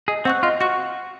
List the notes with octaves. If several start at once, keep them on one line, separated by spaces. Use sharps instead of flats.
G#4 D#5
C4 F#5 C#6 F#6
F4 D#5
F#4 F#5 C#6 F#6